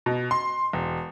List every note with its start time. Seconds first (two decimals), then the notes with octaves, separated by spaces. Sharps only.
0.06 B2
0.31 C6
0.73 E1